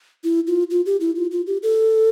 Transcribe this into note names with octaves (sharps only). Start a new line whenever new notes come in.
E4
F4
F4
G4
E4
F4
F4
G4
A4